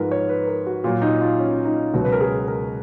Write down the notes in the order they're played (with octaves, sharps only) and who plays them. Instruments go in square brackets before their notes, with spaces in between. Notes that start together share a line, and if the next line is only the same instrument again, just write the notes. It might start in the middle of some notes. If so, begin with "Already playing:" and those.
Already playing: [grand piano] G#2 F3 G#3 A#4 B4
C#5
B4
A#4
F#4
A#2 F#3 F4
D#4
F4
C#4
D#4
C#2 B2 F#3 F#4
B4
A#4
G#4
A#4